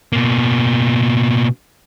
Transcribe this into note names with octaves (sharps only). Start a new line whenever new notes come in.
B2 A#3